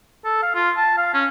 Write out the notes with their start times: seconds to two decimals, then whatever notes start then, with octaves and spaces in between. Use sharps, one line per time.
0.25 A4
0.43 F5
0.55 F4
0.77 A5
0.98 F5
1.14 C#4